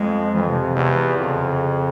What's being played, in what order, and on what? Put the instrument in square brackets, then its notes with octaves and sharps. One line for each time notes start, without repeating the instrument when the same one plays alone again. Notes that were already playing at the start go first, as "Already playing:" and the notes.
Already playing: [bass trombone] F2 [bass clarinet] G#3
[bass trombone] F2 [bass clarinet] E3
[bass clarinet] C3
C3
[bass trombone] E2
[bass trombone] F2 [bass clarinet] C#3
[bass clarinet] C#3
C#3